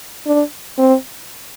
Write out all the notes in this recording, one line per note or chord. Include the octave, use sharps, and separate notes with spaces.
D4
C4